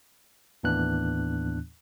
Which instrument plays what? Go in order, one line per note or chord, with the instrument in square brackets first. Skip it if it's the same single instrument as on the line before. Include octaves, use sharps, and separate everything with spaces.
[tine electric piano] D#2 A2 E3 B3 D4 F#6